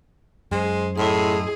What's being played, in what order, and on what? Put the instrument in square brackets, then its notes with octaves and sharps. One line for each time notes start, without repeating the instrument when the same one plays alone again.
[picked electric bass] F#2 [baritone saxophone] G#3 [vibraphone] C5 C6
[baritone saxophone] A2 [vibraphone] E4 D#5 C6 [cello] G#4